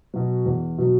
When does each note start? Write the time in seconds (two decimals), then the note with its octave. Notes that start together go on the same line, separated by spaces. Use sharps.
0.14 B2 F#3
0.46 E2
0.78 B2 F#3